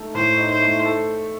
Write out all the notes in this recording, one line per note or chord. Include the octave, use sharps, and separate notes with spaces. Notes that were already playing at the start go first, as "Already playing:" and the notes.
Already playing: A3 D#4 A4
A2 C5
D#4
C5
A3
A4